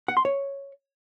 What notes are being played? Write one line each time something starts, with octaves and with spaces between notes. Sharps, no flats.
F#5
C6
C#5